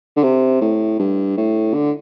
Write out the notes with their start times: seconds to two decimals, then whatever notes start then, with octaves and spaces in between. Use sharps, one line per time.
0.16 D3
0.23 C3
0.61 A2
0.99 G2
1.37 A2
1.74 D3